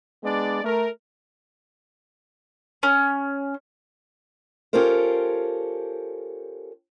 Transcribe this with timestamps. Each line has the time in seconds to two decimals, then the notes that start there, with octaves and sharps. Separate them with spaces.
0.24 G#3 B3 D4 D5
0.65 A3 A#4
2.83 C#4
4.73 C#4 F4 G4 A4 A#4 C5